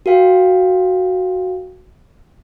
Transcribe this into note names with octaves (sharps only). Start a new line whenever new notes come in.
F#4 A#4 F5 G5